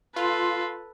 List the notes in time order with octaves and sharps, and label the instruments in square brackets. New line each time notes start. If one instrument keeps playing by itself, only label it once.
[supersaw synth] F4 [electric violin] A4 B4 [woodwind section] C6